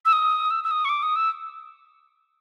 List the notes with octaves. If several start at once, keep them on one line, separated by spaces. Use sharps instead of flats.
E6
D#6
E6
E6
D#6
C#6
D6
D#6
E6